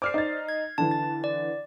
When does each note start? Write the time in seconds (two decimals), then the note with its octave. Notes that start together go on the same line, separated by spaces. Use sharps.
0.02 C5 D5 D6 F6 C7
0.14 D#4 A6
0.49 G#6
0.78 D3 E3 A5
0.91 A6
1.24 D5